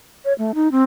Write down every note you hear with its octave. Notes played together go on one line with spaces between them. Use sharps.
C#5
A3
D#4
C4